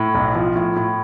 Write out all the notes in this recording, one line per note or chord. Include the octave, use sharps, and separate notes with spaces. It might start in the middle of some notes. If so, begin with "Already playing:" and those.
Already playing: A2
B1
F3
A2
A2